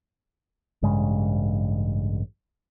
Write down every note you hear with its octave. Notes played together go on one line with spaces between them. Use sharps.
A1 G2 C#3 G#3